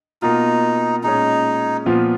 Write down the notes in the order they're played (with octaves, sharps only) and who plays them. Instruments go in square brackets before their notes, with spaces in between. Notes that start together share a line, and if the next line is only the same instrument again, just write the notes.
[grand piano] B2 A#3 F4 [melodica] D#4
[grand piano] A#2 G#3 C#4 [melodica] D#4
[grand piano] A#2 F3 B3 F4